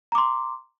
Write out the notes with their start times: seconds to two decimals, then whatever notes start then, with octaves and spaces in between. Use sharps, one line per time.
0.12 A#5
0.15 D6
0.18 C6